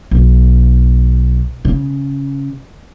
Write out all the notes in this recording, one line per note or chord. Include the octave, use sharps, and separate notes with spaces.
B1
C#3